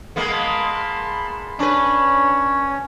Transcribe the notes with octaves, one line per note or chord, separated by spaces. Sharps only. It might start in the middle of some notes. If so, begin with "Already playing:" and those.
G#3 A#3 B3
A5 B5 C6
C#4 D4 B4 C#5